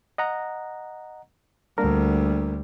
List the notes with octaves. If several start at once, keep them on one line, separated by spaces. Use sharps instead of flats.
D#5 F#5 A#5
D2 G3 A#3 D4 A#4